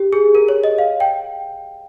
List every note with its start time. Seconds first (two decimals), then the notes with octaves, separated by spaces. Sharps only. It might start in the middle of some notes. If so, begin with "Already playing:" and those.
Already playing: G4
0.13 G#4
0.35 A#4
0.49 C#5
0.64 D#5
0.78 F5
1.00 G5